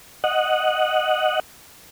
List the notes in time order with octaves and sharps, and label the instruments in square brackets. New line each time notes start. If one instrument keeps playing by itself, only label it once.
[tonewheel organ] D#5 F#5